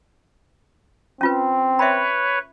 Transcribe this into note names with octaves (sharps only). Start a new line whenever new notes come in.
C4 C#4 F4 B4
B4 C#5 E5 B5